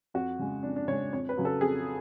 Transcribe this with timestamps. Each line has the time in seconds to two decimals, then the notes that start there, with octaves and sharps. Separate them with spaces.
0.14 F2 F#4
0.39 C#3 G#3
0.63 F2 D4
0.76 D4
0.88 C#3 C#5
0.92 G#3
1.13 F2 C#5
1.29 B4
1.37 C#3 F#3
1.45 A4
1.61 F2 G#4